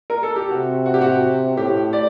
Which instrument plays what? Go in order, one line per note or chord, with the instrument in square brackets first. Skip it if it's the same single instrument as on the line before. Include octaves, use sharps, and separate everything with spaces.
[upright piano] A#4
A4
G4
[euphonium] C3 [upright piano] F#4
[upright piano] F#4
G4
F#4
[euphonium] A2 [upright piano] G4
[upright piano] D5